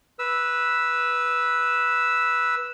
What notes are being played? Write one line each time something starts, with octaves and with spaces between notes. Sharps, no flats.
B4 E6